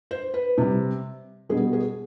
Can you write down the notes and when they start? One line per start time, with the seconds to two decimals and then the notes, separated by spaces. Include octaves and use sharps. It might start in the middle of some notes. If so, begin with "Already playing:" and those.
0.11 C5
0.34 B4
0.58 C3 G3
1.49 B2 G3 G#4
1.73 G#4